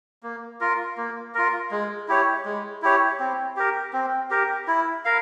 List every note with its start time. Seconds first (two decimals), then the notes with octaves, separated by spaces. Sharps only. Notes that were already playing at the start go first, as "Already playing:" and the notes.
0.23 A#3
0.60 F4 A#4
0.97 A#3
1.34 F4 A#4
1.71 G#3
2.08 E4 G4 C#5
2.45 G#3
2.82 E4 G4 C#5
3.20 C4
3.56 G4 A#4
3.93 C4
4.30 G4 A#4
4.67 E4
5.05 A#4 F5